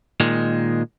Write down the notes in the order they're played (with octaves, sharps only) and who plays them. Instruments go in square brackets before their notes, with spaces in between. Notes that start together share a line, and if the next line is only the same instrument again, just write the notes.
[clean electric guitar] A#2 D#3 G#3